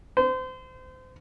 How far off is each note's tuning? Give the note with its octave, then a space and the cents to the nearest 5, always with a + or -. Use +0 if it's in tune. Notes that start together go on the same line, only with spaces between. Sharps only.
C5 -30